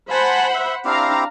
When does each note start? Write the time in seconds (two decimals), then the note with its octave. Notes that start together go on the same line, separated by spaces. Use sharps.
0.11 C5 F#5 G#5 A5 B5
0.54 E5
0.85 C4 D4 E4 G4 F5 A#5